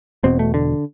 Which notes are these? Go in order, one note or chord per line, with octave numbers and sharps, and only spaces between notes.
E1 E2 B2 C4
A3
D3